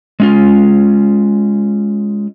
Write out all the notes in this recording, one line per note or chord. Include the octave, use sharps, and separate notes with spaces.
G#3 C#4 F4